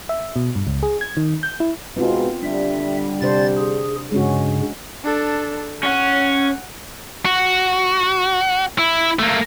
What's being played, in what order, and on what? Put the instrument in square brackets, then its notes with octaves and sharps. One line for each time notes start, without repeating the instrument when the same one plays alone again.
[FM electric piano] E5
B2
G2
C#2
G#4
G#6
D#3
G6
E4
[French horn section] G#2 B2 [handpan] B3 C4 F4
[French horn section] D3 G3 [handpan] D4 [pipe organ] E5
[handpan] C3 D4 C5 [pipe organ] D5 A6
[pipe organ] G#4
[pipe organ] G2 C#3 [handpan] G#3 C#4 F#4
[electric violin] D4 A4
[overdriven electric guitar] C#4 [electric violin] F#5
[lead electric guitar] F#4
E4
A3 A#3